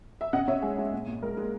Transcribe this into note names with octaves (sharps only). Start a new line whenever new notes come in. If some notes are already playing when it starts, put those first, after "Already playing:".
E5
C#3 D#5 F#5
C#3 C#5 E5
G#3 G#4
G#3
A#2
A#2
G#3 A#4
G#3